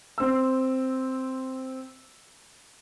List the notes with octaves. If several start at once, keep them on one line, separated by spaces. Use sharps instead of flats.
C4 E6